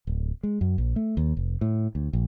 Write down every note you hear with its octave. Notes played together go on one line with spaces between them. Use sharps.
D1
G#3
F#2
A#1
A3
D#2
F1
A2
D2
A#1